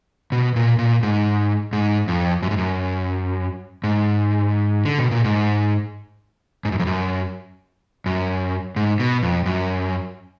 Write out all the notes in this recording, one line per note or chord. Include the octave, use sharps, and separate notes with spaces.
B2
A#2
A#2
G#2
G#2
F2
F#2
G#2
F#2
G#2
D3
B2
A#2
G#2
G#2
F#2
F2
F#2
F#2
G#2
B2
F2
F#2